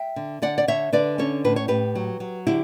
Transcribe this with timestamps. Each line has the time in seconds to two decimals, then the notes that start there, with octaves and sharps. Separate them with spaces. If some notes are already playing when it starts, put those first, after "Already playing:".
Already playing: E5 G5
0.16 D3
0.42 D3 D5 F#5
0.58 D5
0.68 D3 C#5 E5
0.93 D3 B4 D5
1.18 C#4 A4 C#5
1.44 A2 B4
1.56 C#5
1.68 A2 G4 B4
1.95 F#3
2.20 F#3
2.47 D3 E4 G4